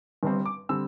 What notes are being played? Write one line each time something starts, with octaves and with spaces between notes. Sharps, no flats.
G1 G2 G3 C4
D6
D3 G3 C4 E6